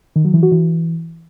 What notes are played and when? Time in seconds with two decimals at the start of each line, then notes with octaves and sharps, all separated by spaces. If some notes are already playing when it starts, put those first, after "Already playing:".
0.16 D#3
0.25 F#3
0.34 E3
0.43 F#4
0.52 E3